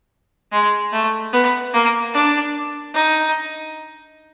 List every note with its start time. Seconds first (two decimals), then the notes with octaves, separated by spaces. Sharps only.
0.52 G#3
0.93 A3
1.33 B3
1.73 A#3
2.14 D4
2.94 D#4